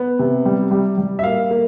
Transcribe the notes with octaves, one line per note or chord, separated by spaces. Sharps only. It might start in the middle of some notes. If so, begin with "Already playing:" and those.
Already playing: B3
C3
G3
G3
G3
E5
A#3 F5
A#3